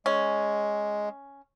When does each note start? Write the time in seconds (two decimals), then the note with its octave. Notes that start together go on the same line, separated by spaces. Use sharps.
0.06 G#3 C#4